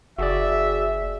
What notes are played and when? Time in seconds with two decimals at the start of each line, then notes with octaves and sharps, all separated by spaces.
0.18 F#1 F#4 G#4 D5 E5